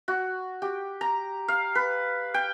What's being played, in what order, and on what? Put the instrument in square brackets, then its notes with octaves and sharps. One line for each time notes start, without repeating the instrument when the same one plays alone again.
[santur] F#4
G4
A#5
F5
B4
G5